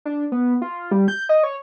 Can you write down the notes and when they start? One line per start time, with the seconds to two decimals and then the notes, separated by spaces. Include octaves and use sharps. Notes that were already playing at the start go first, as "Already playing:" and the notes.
0.05 D4
0.32 B3
0.62 F4
0.91 G3
1.08 G6
1.29 D#5
1.43 C#5